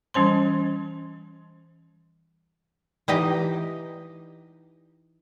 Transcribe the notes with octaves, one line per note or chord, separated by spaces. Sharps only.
E3 G3 C#4 C5 C6
E3 D#4 G4 D#5